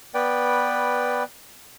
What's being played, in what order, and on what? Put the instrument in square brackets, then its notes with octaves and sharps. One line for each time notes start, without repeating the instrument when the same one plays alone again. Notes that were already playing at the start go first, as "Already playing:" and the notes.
[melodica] B3 B4 D5 G5